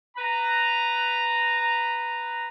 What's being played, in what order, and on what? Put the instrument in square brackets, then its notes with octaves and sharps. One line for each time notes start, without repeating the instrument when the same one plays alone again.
[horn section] B4 A#5